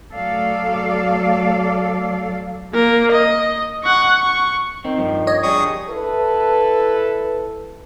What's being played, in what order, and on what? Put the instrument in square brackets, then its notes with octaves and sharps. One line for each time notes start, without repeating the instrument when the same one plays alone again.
[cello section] F#3 A3 A4 D5 F5
[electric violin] A#3 A#4
D#5
F#5 C#6
C#6
[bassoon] D#3 [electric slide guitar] C4
[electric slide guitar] G2 F3
[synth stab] C#5 D#5
[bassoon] G3 [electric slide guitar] D4 G4 G#4 [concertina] C#6 D#6
[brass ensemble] E4 A4 B4